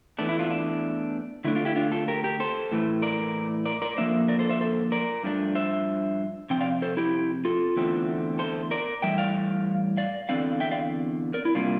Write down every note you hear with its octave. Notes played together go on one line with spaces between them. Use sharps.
E2 E3 A3 D4
E4
D4 F4
D4
D3 A3 D4 E4
D4 F4
E4 G4
D4 F4
F4 A4
G4 A#4
G4 A#4
A4 C5
A2 E3 A3
A#4 D5
A#4 D5
A#4 D5
D3 F3 A#3 D4 C5 E5
A#4 D5
A4 C5
C5 E5
A4 C5
A#4 D5
G2 F3 A3 D4
C5 E5
C3 F3 C4 G5
D5 F5
A4 C5
E4 G4
F4 A4
E2 D3 A3 C4
A4 C5
A#4 D5
A2 E3 G3 E5 G5
D5 F5
D5 F5
E2 D3 A3 C4 D5 F5
E5 G5
D5 F5
A#4 D5
E4
C3 G3 A#3 D4 F4